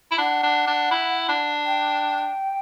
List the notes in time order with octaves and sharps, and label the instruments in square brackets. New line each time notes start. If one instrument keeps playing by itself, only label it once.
[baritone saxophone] E4
[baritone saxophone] D4 [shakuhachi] F#5
[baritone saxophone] D4
D4
E4
D4
[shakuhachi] G5